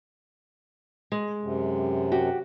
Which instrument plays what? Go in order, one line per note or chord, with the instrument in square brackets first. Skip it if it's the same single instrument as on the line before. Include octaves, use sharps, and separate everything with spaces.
[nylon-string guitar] G#3
[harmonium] F#2 C3
[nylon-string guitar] F#4 G4